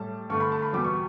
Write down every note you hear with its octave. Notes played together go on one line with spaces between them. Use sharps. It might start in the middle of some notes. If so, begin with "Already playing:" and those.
Already playing: A2 G3 A5
G2 D3 A3 C#6
B5
A5
B5
E2 B2 G3 D6
C#6